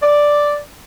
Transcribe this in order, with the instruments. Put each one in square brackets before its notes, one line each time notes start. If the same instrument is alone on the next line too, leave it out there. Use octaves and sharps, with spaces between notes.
[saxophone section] D5